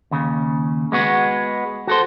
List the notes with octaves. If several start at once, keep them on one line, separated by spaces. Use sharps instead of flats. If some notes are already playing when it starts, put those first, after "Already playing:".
D#2 C#3
G#3 B3 F#4
F#4 A4 C5